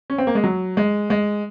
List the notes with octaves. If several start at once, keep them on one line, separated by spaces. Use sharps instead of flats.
C#4
C4
A#3
G#3
F#3
G#3
G#3